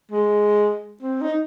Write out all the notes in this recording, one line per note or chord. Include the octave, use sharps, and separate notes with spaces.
G#3
C4
D#4